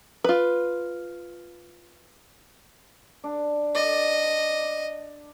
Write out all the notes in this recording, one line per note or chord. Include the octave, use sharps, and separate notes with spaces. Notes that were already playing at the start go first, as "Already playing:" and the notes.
F4 B4
D4
D5 D#5